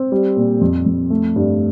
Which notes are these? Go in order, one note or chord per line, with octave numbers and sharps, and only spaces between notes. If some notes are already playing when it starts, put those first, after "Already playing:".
Already playing: C4
G3
A#2
F2
F2
A3
G2